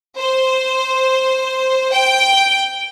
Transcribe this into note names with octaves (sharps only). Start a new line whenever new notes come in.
C5
G5